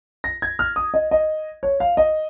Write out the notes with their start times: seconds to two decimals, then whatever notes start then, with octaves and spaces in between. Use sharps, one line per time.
0.24 A#6
0.42 G#6
0.59 F6
0.76 D#6
0.94 D#5
1.11 D#5
1.63 C#5
1.80 F5
1.97 D#5